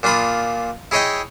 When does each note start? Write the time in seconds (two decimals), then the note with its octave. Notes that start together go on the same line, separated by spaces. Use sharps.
0.03 A#2 D4 F4 B5 D#6
0.91 E4 G#4 C#5 D#5 E5 G5